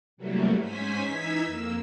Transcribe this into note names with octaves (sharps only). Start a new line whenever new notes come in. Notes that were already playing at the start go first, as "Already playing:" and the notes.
C3 E3 F#3 G3 A3 A#3
G#2 C#4 C5 G#5 B6
E3 D#4 E6 G#6 B6
F2 A#3 E6